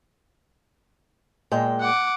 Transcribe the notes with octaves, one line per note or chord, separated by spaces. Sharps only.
A#2 G#3 G5
F#5 D6